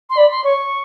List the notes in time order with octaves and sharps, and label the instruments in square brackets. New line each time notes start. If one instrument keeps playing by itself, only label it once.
[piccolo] C6
[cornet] D5 [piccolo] B5
[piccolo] C6
[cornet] C#5 [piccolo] C#6